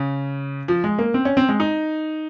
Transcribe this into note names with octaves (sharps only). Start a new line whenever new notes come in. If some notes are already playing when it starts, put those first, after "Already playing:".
Already playing: C#3
F3
G#3
A#3
C4
C#4
C4
G#3
D#4